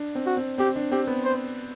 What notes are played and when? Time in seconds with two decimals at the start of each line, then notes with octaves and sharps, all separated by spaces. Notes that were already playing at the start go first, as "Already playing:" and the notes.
Already playing: D4
0.15 C4
0.26 F#4
0.37 C4
0.58 C4 G4
0.76 D4
0.92 C4 G4
1.07 B3
1.24 C5